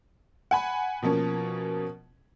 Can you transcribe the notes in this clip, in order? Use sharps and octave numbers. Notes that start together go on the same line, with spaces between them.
F#5 G#5 B5
B2 F3 A#3 C#4